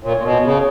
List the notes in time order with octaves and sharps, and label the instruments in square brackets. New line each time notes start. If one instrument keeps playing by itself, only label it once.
[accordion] A#2 [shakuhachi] C#5
[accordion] A#2
B2
C#3